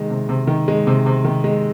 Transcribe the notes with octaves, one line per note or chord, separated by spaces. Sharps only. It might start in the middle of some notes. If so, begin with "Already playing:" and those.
Already playing: C3 D#3 G#3
C3
C3
D#3
G#3
C3
C3
D#3
G#3